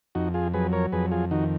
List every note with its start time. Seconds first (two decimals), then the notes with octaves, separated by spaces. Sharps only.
0.15 F2 D#4 F#4
0.34 F4 G#4
0.54 F#3 G#4 B4
0.73 A#4 C#5
0.92 F2 G#4 B4
1.11 F4 G#4
1.31 D#3 D#4 F#4